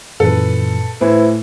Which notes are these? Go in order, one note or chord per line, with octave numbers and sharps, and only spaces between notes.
F#2 A#2 E3 A4 B4
A2 E3 C5